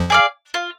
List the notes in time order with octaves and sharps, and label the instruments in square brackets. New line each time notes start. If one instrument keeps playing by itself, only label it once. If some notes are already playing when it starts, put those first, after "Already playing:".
Already playing: [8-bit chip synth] F2 F3
[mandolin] G#4 D5 F5
F4